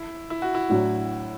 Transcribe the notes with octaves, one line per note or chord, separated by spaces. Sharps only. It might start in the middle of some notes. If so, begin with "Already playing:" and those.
Already playing: E4
E4
F#4
E4
A2 F#3 D4 F#4